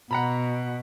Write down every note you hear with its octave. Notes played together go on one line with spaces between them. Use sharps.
B2 F#5 A#5 B5